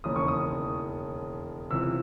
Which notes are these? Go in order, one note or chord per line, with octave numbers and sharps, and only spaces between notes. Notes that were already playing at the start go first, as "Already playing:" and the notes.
E1 D#2 C#3 E3 D#6
C#6
D#6
C#2 C3 E3 E6